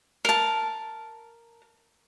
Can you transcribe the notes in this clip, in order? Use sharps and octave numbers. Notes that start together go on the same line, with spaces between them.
A#4 A5